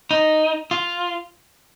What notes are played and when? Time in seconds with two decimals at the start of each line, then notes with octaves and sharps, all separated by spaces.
0.11 D#4
0.71 F4